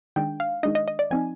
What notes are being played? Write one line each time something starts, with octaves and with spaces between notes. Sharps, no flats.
D#3 G#3 D4 G5
F5
D#3 G#3 D4 D#5
D#5
D#5
D5
F3 C4 D#4 G#5